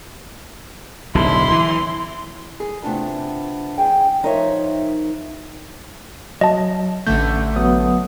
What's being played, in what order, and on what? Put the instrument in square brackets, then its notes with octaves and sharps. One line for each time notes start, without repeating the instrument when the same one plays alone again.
[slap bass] D1 B1 D3 [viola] E4 C6
[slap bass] E3
[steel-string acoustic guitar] G#4
C3 G3 A3 B3 D4 F4
E2 G#4 G5
F3 D#4 A#4 C5 C#5 E5
[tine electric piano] F#3 [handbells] D#5 A5
[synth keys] A1 D3 A3 [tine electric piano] G6
[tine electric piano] F#3 B3 D#6